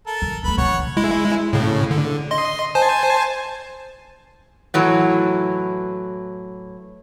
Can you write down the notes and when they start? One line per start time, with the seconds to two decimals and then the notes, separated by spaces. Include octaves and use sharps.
0.07 A4 A#4
0.22 D#3
0.44 A3 A#3 B4 B5
0.58 C#3 E3 C#5 F#5
0.97 G#3 E4
1.53 A2 C#3
1.91 D3
2.31 D#5 C6
2.75 C5 G#5 A5
4.74 A2 E3 F#3